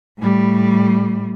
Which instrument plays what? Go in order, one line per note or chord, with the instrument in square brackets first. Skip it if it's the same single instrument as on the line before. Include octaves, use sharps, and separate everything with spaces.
[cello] A2 G3